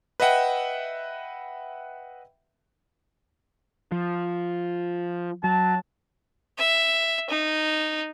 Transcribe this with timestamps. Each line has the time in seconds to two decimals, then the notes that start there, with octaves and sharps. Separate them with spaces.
0.20 B4 D#5 E5 F#5 G5
3.92 F3
5.44 F#3 A5
6.58 E5
7.30 D#4